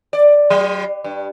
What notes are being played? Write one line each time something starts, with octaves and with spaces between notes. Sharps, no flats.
D5
F#3
G2